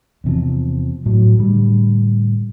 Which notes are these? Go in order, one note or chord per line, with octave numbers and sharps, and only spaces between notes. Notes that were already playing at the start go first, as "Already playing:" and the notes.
E2 C3 F3
A2 F#3
A2 D3 G3